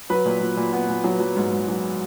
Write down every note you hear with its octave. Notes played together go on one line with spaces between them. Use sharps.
F#3 B4
A#2
A#2
A#2
B3
A#2
F#3
F#3
G#2
G#2
F#3